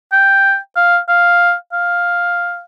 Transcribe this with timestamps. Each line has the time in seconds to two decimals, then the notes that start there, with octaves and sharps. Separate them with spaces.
0.12 G5
0.76 F5
1.09 F5
1.73 F5